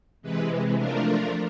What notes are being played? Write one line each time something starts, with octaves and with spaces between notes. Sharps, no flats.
C3 E3 G#3 B4
F3 A3 D4 F4 A#4